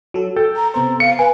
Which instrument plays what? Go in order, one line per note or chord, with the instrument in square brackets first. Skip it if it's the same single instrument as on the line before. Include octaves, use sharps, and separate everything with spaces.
[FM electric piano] F#3 A4
[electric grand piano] A4 [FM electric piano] G5
[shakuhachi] A#5
[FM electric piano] C3 B3 C5 [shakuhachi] A#5
[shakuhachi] F5 [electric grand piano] C#7
[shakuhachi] B4 [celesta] G#5